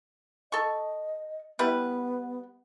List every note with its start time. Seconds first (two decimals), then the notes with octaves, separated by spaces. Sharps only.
0.52 A4 D#5 C#6
1.59 G3 B3 E4 B4